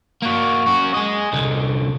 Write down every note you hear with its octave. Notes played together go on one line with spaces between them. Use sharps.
A#3 F#4
C#4 F#4
G#4 D#5
C2 D3